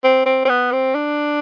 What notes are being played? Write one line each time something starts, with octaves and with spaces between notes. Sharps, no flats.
C4
C4
C4
B3
C4
D4